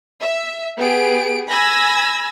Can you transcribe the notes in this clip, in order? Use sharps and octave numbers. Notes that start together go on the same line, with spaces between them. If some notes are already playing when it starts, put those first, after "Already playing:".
E5
B3 G4 G#4 D7
G#5 B5 E6 G#6 A#6